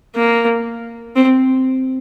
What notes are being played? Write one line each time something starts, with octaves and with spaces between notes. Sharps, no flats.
A#3
C4